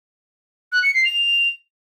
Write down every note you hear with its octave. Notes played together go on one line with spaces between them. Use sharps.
F#6
C#7
C7
F7